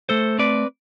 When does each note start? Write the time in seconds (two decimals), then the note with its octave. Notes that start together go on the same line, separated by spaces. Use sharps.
0.09 A3 A4 C5
0.39 C4 B4 D5